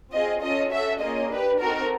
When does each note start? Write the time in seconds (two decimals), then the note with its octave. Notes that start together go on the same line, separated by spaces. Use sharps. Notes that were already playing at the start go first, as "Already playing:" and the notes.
0.12 C4 F4 G#4 D#5
0.42 C#4 F4 A4 D#5
0.70 C#4 F#4 A4 E5
1.00 A#3 C#4 F4 G#4 D#5
1.29 D4 G4 B4
1.59 C4 D#4 F#4 A4 A#4